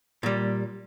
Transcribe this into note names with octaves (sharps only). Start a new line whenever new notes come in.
A#2 G3